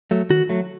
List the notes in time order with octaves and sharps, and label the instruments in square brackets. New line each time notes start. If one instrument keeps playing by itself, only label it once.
[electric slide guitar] F#3 A3
D#3 F#4
F#3 A3